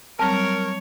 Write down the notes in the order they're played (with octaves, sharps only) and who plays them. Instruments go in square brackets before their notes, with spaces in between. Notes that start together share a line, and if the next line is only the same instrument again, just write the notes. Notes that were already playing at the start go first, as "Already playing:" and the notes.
[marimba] F#3 G3 C4 [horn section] A#4 [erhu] C#5 [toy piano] A5